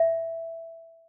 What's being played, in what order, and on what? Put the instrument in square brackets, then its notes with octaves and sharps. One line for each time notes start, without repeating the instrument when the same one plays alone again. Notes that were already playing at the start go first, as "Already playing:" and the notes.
Already playing: [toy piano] E5